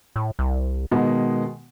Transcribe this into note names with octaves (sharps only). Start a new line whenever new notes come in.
A2
C2
B2 D#3 G#3 B3